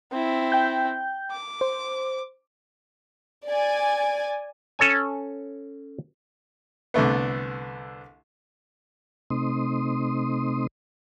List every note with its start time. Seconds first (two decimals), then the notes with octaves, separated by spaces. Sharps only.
0.12 C4 E4
0.52 G5 G6
1.31 D6
1.61 C5
3.48 D5 G#5
4.79 C#4 A4 C#5 G#5
6.94 C2 D3 A3 B3
9.30 C3 A3 C4 D#4 C6 D#6